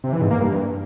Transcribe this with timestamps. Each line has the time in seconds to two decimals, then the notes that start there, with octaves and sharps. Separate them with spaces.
0.04 C3
0.13 E3
0.22 G#2
0.31 A#3
0.40 G2